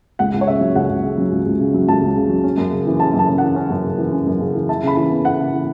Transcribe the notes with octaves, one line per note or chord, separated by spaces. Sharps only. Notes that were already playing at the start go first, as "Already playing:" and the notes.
C#2 F#5
C#2
C#5
C#3 E5
F#3
C#2 F#5
C#2
C#3
F#3
C#2
C#2
C#3
F#3
C#2 A5
C#2
C#3
F#3
C#4
F#2
C#3
E3
C#4 A5
F#2
A5
C#3
E3 F#5
C#4
F#2
C#3
E3
C#4
F#2
C#3
E3
E4 A5
C#3 B5
E3
B3
E4 F#5
C#3
E3